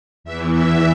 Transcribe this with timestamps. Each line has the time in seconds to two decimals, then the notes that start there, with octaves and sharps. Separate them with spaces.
0.24 E2 E3 E5
0.53 E5